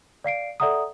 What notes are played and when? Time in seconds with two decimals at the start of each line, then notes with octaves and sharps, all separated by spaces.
0.24 D5 F5 C7 D7
0.60 A4 D5 E5 F#5 A#5 D#6